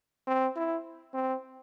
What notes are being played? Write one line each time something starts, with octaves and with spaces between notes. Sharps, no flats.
C4
E4
C4